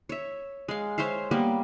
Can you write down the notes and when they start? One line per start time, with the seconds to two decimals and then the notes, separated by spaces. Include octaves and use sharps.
0.09 C#5 E5
0.68 G#3 F5
0.98 C5 C#5 E5 F5
1.31 G3 A#3 B3